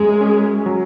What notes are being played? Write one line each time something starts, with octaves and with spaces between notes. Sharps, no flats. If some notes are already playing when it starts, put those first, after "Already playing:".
Already playing: F#2 G#3
C#4
F#3